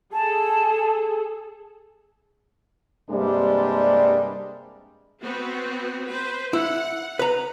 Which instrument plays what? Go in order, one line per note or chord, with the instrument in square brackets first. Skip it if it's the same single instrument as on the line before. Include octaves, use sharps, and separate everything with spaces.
[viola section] G#4 A4 [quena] A5
[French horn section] G2 C3 G3 G#3 A#3 D4
[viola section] B3 C4 F#4
B4 C5
[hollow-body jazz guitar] E4 [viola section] F#5
[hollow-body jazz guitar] B4 A#5